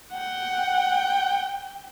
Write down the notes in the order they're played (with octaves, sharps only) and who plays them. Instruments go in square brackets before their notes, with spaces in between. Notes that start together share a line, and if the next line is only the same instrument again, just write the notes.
[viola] F#5 [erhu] G5